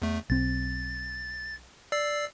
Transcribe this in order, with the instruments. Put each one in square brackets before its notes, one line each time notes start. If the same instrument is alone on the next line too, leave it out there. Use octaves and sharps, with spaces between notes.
[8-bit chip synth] E2 A3
[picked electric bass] B1 C4 [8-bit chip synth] A6
[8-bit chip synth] D5 E6 C7